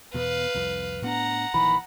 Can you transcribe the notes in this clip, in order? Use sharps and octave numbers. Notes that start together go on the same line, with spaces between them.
E2 B2 B3 B4 F5
C2 F2
A2 B3 D4 F#5 A#5
A#1 D#3 E3 B5